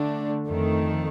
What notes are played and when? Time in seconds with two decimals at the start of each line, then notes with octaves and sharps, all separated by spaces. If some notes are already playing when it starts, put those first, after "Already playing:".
Already playing: D3 A3 D4
0.47 F2 D#3 A3